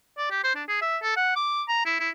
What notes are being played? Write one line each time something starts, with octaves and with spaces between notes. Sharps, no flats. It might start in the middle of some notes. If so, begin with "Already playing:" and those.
D5
G4
C5
D4
G#4
E5
A4
F#5
D6
A#5
E4
E4